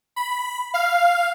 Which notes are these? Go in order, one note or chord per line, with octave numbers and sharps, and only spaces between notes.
B5
F5